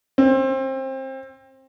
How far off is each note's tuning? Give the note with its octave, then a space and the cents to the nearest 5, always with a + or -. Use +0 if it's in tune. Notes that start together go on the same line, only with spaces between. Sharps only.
C4 +25